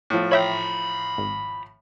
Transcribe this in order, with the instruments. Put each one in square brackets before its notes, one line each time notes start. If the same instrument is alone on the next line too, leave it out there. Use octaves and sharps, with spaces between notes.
[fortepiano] A2 F3
[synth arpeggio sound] C#5 E5 G5 [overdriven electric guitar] A#5 B5
[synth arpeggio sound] G#1